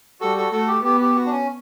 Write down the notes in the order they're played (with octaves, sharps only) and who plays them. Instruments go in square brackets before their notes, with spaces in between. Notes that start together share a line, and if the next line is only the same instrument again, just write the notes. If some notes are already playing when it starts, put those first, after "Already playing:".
[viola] G3 [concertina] F#4 A4
[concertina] F#4 A4
[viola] A3 [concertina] F#4 A4
[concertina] G4
[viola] B3 [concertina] G4
[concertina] G4
F#4
D4
C#4